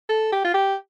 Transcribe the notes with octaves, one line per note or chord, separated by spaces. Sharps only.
A4
G4
F4
G4